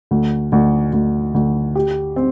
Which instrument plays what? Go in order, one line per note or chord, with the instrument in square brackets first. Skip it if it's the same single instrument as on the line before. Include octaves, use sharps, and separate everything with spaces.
[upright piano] D2
D2
D2
D2
G4
C4